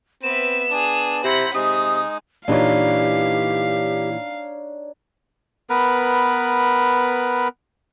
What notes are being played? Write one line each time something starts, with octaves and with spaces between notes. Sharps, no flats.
B3 C4 B4 E5 E7
D4 G#4
C3 E4 C5 F#5 A#5 B5
C3 G#3 D#4 D#6
A#2 E3 D4 D#4 G4 C#5 F5
B3 A#4 B4